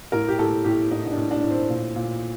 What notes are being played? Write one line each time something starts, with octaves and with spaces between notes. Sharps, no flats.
A2 A#4
G4
A2 A4
A2 G4
A2 D#4
D#4
D4
A2
D4
A2
C4
A#2
A#2